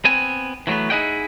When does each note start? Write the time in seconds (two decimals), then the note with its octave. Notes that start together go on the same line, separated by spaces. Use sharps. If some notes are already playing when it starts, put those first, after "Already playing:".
0.05 B3 C4 G#5
0.67 E3 F#3 G#3 A3 B3
0.90 D#4 E4 G#4 D#5 F#5 G5